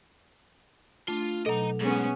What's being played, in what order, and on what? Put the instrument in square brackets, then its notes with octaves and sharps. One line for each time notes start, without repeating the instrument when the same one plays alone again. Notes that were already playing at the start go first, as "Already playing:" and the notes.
[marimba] A3 D4 [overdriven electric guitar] F4
[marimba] B2 F#3 [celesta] A4 [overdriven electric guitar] D#5 A#5
[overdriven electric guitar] G#2 [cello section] B3 C#4 [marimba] G#4